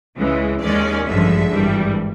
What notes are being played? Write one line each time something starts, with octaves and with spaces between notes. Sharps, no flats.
C#2 C#3 E3 G#3
D#2 D#3 G#3 C#4 D5
A1 G2 D3 F3 G#3 E5
G#1 G2 E3 G3